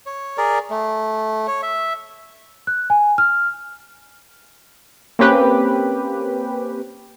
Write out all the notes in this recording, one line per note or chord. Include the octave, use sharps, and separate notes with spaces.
C#5
G#4 A#4 D5
A3
C#5
E5
F#6
G#5
F6
A#3 C4 C#4 G4 B4